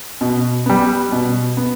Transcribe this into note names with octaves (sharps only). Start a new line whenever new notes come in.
B2
G3 B3
B2
B3